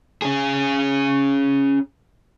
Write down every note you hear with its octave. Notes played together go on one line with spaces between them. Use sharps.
C#4 G#4